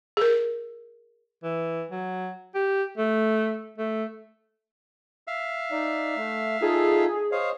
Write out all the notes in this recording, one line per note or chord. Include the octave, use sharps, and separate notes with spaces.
G#4 A#4
E3
F#3
G4
A3
A3
E5 F5
D#4 D5
A3
D#4 F4 G#4 A4
C5 C#5 D#5 F5